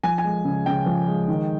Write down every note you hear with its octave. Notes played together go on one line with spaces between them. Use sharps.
F3 G#5
G#5
G#3
C#3
C#3 G5
F3
G#3
D#3